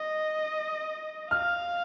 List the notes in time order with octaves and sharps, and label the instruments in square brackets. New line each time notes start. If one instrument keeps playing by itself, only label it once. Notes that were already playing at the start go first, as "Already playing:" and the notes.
Already playing: [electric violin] D#5
[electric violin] F5 [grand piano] F6